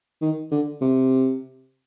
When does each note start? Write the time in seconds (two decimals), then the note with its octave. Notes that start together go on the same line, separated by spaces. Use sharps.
0.21 D#3
0.51 D3
0.81 C3